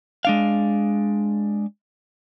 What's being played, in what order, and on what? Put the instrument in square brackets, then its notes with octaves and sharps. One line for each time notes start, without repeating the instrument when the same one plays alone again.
[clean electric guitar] G#3 D4 F5